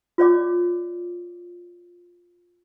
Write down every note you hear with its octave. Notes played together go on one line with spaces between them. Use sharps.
F4 C#5 D5 D6